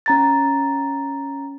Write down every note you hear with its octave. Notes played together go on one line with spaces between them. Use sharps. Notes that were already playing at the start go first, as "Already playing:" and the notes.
C#4 A#5 A6